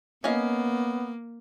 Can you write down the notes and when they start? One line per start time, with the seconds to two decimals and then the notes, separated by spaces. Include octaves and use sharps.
0.24 A#3 B3 C#4 D#5 F5